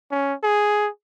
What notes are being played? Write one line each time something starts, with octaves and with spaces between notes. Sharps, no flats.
C#4
G#4